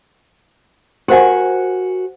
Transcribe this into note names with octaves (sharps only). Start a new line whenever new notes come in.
F#4 G4 A#4 C5 F#5 G#5